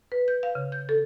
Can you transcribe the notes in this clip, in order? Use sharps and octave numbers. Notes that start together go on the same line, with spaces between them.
B4
G6
F5
C#3
G6
A4